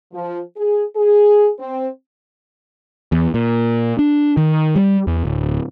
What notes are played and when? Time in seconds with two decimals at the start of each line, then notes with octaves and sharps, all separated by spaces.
0.13 F3
0.57 G#4
0.96 G#4
1.59 C4
3.12 E2
3.34 A#2
3.99 D4
4.37 D#3
4.76 G3
5.07 E2
5.25 D1